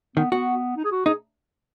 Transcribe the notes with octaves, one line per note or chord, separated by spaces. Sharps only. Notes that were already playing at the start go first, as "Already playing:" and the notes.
D#3 B3
B3 F#4
D#4
G#4
F#4
D#4 G#4